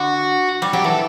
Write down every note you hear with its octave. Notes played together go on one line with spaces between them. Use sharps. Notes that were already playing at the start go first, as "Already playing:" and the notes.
Already playing: D3 F#4
G3
F#3 G4
E3 A4